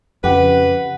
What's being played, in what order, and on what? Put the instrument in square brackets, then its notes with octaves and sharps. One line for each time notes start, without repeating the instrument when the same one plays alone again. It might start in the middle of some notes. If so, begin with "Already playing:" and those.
[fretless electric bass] F2 [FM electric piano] C#3 G4 [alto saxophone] B4 [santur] F#5